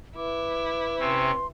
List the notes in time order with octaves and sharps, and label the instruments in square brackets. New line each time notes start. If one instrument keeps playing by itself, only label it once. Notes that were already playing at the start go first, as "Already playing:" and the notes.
[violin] E4 [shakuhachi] B4 [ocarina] D6
[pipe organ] C3 C4 C#4 [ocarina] C6